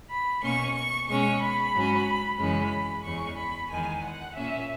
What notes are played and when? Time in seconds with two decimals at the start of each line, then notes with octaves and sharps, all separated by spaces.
0.09 B5
0.42 B2 A#3 C#4 C#6
0.75 C#6
1.07 B2 G#3 C#4 C#6
1.40 B5
1.73 G#2 F#3 C#4
2.38 F#2 C#3 E3 G#3 C#4 B5
3.03 E2 C#3 G#3 C#6
3.37 B5
3.69 E2 D#3 G#3 G#5
4.02 F#5
4.34 A#2 A#3 C#4 E5